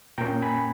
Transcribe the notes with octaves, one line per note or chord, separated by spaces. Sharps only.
A#2 A#3 C#4 G5 A#5
G#5 B5